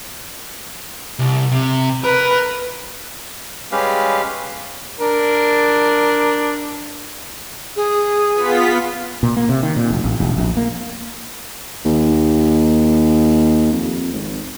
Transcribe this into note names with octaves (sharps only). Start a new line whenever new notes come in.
C2
C3
A#4 B4
G3 G#3 C#4 G4 B4 F5
D4 A#4
G#4
B3 F4 B6
A#2
A#3
C3
D#3
A#2
F1
A1
E1
A#1
A#3
D#2
F2
G#1